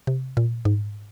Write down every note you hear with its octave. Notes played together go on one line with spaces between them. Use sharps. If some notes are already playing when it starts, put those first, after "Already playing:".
C3
A#2
G#2